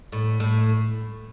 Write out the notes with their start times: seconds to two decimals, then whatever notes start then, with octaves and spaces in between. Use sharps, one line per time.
0.12 A2
0.40 A2